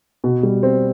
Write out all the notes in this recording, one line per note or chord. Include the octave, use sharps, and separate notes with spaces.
B2
G3
C4